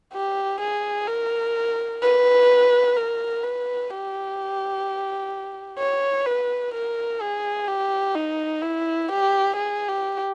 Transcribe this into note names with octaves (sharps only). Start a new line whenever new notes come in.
G4
G#4
A#4
B4
A#4
B4
G4
C#5
B4
A#4
G#4
G4
D#4
E4
G4
G#4
G4